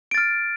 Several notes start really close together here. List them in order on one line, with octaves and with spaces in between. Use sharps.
D7 A6 F6